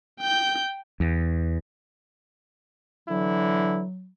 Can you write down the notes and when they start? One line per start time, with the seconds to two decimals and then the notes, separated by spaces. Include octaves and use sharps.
0.21 G5 G6
1.00 E2
3.09 D3 E3 F#3 E4